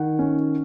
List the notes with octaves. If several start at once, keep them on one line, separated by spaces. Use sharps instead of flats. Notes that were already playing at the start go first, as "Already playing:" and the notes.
Already playing: D#3 F#5
C#4